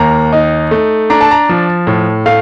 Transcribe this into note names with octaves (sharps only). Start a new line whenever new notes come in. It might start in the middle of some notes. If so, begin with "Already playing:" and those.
Already playing: D#2 A#3 A#5
D#4
A3
D4 A#5
A5
A#5
F3
A2
A3 F5